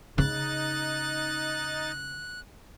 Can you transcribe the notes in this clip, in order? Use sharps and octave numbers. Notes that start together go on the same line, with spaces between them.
C#3 D#4 F#6 A6